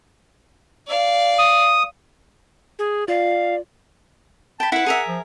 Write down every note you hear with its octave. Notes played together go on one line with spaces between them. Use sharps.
D5 F5
D#6
G#4
F4 D5 F5
G5 A5 B5
E4 B4 F#5
G#4 A#4 E5
F3